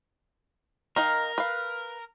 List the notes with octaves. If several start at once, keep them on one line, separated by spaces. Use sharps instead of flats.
D#3 D#4 A#4 F5
B4 F5